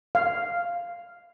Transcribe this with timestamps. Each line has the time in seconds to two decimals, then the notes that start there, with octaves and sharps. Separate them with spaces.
0.15 F5